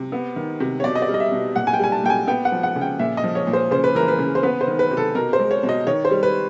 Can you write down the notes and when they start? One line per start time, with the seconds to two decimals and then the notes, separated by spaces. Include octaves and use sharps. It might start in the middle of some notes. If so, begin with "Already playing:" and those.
Already playing: C3
0.12 B3
0.36 D#3
0.60 C3
0.80 C#5
0.84 B2 D5
0.96 D#5
1.02 D5
1.08 G3
1.14 D#5
1.20 E5
1.32 B2
1.56 A#2 F#5
1.67 G#5
1.73 G5
1.79 G3 G#5
1.92 A5
2.04 A#2 G5
2.10 G#5
2.27 B3 G5
2.45 F#5
2.52 F3
2.63 F#5
2.76 C#3
2.81 G5
2.99 A#2 E5
3.17 D#5
3.24 F3
3.35 C#5
3.47 A#2
3.53 C5
3.71 C#3 C5
3.84 B4
3.95 E3 A#4
4.08 B4
4.19 C#3
4.35 C5
4.43 B3 B4
4.61 C5
4.67 D#3
4.79 B4
4.91 C3
4.97 A4
5.15 B2 A#4
5.33 C5
5.39 G#3
5.51 C#5
5.63 B2
5.69 D#5
5.87 D#3 C#5
6.05 C5
6.11 G3
6.23 B4